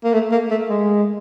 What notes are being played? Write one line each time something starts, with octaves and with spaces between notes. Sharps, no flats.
A#3
A3
A#3
A3
G#3